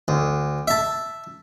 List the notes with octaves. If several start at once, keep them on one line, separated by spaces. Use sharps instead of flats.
D2
E5 A5